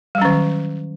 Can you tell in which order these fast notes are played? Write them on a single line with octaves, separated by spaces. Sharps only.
G3 F#3 C#4 D#3